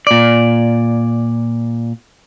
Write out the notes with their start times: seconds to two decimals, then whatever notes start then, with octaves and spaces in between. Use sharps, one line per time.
0.07 A#2 D5